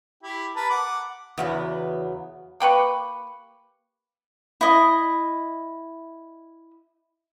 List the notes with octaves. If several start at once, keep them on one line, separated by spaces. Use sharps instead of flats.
E4 G4
A#4 B4 A5
F#5 D6
E2 C#3 F#3 B3
A#3 G4 B4 C#6
E4 D#5